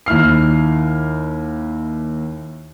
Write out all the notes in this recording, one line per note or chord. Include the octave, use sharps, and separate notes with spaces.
D#2 E4 F6 C7